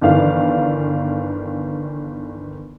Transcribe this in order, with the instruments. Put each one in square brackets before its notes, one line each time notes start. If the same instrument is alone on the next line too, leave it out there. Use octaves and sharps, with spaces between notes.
[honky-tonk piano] G1 D#3 E3 D4 F5